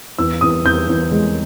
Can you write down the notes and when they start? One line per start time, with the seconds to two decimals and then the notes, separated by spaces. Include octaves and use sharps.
0.18 E2 E6
0.41 E2 D#6
0.65 E2 G6
0.89 E2
1.11 G#3